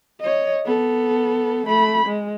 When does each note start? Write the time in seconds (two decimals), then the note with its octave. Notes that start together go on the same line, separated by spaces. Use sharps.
0.20 C#5 D#5
0.66 B3 A4
1.67 A3 B5
2.06 G#3